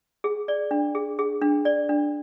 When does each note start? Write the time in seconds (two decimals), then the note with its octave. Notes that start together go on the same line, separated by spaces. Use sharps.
0.24 G#4
0.48 D5
0.71 D4
0.95 G#4
1.19 G#4
1.42 D4
1.65 D5
1.89 D4